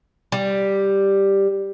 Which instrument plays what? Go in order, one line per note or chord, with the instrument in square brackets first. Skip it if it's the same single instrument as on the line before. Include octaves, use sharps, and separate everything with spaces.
[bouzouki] G3